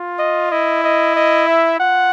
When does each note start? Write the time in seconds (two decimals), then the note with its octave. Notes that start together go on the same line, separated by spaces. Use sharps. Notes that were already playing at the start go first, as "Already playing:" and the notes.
Already playing: F4
0.19 D#5
0.51 E4 D#5
0.84 D#5
1.16 D#5
1.47 E5
1.80 F4 F#5